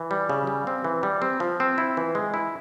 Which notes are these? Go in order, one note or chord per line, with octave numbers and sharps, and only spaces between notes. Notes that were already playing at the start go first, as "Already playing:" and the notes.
Already playing: E3
G3
C#3
G3
C4
E3
G3
C4
F3
C4
E4
E3
G#3
E4